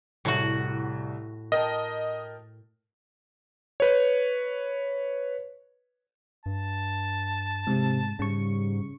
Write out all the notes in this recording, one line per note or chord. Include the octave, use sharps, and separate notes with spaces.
C2 A2 F#4
A#4 D#5 G5 A5
B4 C#5
G2 A5
G#2 C3
G#2 C#3 G3 C#6